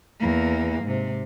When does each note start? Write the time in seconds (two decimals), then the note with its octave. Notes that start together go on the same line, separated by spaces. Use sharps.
0.20 E2 A#3
0.84 G#2 C3